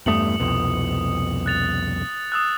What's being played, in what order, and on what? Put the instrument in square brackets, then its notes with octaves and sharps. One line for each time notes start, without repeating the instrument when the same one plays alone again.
[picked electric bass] E2 G2 A3 [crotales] D#6 C#7 F#7
[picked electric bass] C2 F2 B2
[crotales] F#6 A6 F7
D#6 E6 F#6